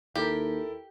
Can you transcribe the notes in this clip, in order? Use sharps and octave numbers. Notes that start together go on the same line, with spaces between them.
D#2 E4 G4 A4 A#4